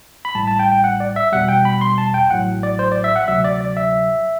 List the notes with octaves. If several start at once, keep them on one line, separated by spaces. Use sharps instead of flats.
B5
A1 A2 G3 A5
A5
G5
G5
F#5
D5
E5
E2 B2 G3 F#5
G5
B5
C6
A5
G5
A1 A2 F#3 F#5
D5
C5
D5
E5
F#5
D2 C3 F#3 E5
D5
D5
E5